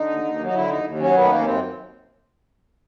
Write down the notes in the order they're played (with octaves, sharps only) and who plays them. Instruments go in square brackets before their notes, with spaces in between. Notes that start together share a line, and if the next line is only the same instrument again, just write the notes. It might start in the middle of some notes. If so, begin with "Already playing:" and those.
Already playing: [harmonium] D3 D#4
D#2
D#2
F#3
D#4
D3 E4
D#2 D#4
D#2
F#3 C#4
D#3 B3
A3
D#2 A#3
C#4
F#2 C4